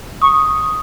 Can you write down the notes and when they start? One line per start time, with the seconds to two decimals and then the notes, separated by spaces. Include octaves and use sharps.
0.22 C#6 D#6